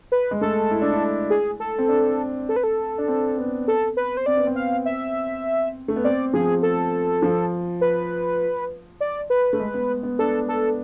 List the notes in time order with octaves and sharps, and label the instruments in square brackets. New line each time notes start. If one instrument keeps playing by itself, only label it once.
[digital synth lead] B4
[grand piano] G#3
[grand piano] A3 [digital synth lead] A4
[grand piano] E4
D4
E4
[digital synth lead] G#4
A4
[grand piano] C4
D4
[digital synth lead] A4
B4
A4
[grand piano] D4
C4
B3
[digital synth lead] A4
B4
C5
[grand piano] C4 [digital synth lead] D5
[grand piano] B3
C4
[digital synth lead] F5
E5
[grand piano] A3
B3
[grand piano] C4 [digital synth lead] D5
[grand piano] F3 [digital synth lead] G#4
[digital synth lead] A4
[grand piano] F3
[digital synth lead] B4
D5
B4
[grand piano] A3
G#3
B3
B3
[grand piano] D4 [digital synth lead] A4
[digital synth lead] A4